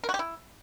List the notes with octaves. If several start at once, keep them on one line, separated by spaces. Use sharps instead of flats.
A#4
F#4
G4
E4